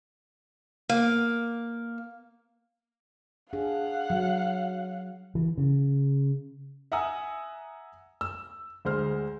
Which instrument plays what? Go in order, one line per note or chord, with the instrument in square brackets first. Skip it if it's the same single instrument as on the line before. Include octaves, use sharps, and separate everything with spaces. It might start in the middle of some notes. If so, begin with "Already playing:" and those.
[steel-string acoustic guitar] A#3
[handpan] D4 G#4 [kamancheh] F5 F#5
[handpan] F#3
[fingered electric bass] E3
C#3
[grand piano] E5 F#5 G#5 A#5 D#6 E6
E6
D2 G#3 C5 F6